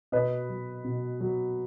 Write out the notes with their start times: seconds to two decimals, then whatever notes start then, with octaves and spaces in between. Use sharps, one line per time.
0.12 B2 B4 D#5
0.49 F#3
0.85 B2
1.21 F#3